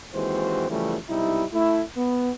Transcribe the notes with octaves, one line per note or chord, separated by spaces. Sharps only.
D#2 E3 G#3 C4 F#4 C5
C#3 E3 F3 G3 A3
B1 C3 G3 D#4 E4
A3 E4
B3